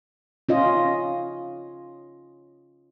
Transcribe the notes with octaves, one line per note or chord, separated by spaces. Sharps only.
C#4 F4 D#5